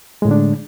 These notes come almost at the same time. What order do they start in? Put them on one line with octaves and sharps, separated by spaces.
G#3 A2 D3 D4